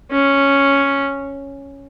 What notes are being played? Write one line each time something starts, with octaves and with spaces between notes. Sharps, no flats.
C#4